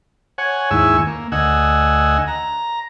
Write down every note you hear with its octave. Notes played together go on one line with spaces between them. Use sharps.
C#5 F#5 G#5
D#2 G#2 E4 G#5 C#6 E6
A#3
D2 D#5 F#5 G#5 E6
A#5